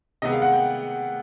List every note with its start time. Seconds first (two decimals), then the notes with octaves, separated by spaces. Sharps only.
0.22 C3 D#3 G#3 B3 D#5
0.32 F5
0.42 F#5
0.52 G5